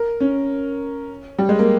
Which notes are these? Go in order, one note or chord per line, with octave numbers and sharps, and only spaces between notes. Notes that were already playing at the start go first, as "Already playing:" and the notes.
Already playing: A#4
C#4
G3
G#3
A#3